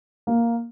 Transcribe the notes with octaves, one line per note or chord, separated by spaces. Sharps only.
A#3